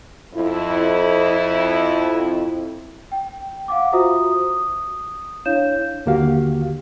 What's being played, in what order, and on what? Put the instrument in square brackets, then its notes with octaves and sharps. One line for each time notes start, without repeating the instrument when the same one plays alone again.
[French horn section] F2 E4
[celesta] G5
F5 F#5 D6
F4 F#4 C5 E5 A#5 D#6
D#6
D4 E4 C#5 F5 G6 E7
[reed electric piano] D#2 D3 A#3 F#4 G4 F5